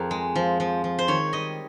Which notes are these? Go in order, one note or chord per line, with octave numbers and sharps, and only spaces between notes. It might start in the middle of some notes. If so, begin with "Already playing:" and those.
Already playing: F2 C4 G#4 A#4
G#3
F3
F3
F3
C5
D#3 C#5
G3 D#5